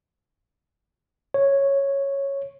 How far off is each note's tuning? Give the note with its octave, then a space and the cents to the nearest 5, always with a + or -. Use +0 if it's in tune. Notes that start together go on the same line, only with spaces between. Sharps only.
C#5 -5